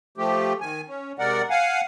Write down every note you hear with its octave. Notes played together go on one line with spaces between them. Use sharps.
F3 A3 G4
D#3 G#5
C#4
C3 G#3 A#4 D5 F#5
F5 F#5 G#5